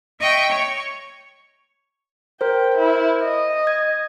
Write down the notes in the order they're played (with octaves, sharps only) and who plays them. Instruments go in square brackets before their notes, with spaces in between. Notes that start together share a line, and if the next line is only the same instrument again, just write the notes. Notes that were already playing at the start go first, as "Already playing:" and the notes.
[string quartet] D#5 E5 G5 C#6
C#5
[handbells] A#4 C5 [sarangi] G5
[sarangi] E4
D#5
[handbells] G#6